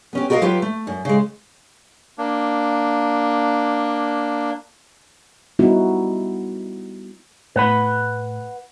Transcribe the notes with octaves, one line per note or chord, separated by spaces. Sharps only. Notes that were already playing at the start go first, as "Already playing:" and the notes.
B3 C#4 G4
F#4 G4 A#4 D5 D#5 F5
F#3 F4 G4 B4
A3
F#2
C#3 G#3
A#3 D4
G3 B3 D#4 E4 F#4
A2 B4 F#5 B5